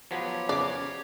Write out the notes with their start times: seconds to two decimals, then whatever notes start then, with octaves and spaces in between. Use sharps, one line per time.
0.11 F3 F#3 B3 G4 C#5
0.49 C#3 D5 D6